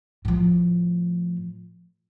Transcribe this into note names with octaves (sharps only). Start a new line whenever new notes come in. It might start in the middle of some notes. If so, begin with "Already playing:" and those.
A2 F3